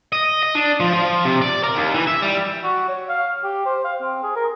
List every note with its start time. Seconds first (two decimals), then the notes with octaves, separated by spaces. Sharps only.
0.12 D#5
0.43 D#5
0.55 D4
0.80 F3
0.94 F3
1.25 C3
1.41 D5
1.64 A#4
1.76 D#2
1.94 E3
2.07 E5
2.22 G3
2.64 F#4
2.88 C#5
3.09 F5
3.44 G4
3.66 C5
3.84 F5
4.02 C4
4.23 G#4
4.36 A#4